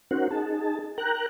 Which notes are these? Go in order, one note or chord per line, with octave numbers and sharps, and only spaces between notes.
C#4 D#4 F#4 A#4 C5 F#5
D#4 G#4 A5
A#4 G5 A#5 F#6